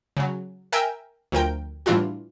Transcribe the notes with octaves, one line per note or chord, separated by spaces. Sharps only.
C#3 F#3
A#4 E5 G5 G#5 E6
D2 F3 A#4 G5
A2 E3 G3 D4 F4 F#4